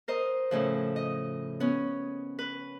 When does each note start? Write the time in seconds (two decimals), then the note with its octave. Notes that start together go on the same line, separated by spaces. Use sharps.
0.08 A#4 C5 D#5
0.51 A2 C#3 F3
0.96 D#5
1.60 B3 C#4
2.39 B4